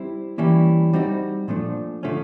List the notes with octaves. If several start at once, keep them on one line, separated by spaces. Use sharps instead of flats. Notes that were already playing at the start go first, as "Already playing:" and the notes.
Already playing: G3 C4 E4
E3 G3 A#3 C#4 E4
G3 C4 D#4 F#4
A#2 F3 A3 D4
D3 F3 A3 C#4